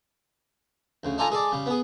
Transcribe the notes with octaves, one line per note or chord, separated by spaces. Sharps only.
D2 C#3
D4 D#4 F4 A4 G#5 A#5
G#3 G#4 A4 D5
C#3 G3
B3 G#4